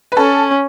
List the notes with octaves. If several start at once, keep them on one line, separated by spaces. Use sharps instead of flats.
B4
C#4 A4